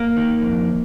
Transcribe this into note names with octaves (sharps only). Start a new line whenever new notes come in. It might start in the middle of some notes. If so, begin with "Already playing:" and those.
Already playing: A#3
D#3
F2